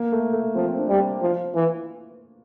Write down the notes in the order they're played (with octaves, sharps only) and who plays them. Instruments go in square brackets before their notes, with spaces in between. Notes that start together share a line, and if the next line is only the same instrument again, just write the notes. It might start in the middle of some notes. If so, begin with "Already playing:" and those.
Already playing: [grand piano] A#3
A3
A3
[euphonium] F3 [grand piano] C4
[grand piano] C4
D4
[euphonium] G3
[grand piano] C4
[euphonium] F3 [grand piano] F4
[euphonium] E3